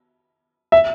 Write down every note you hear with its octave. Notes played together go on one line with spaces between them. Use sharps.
E5